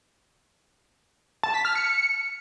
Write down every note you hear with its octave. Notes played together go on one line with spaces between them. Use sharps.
A5
B6
F6
C#7